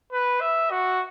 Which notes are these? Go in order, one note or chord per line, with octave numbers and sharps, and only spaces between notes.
B4
E5
F#4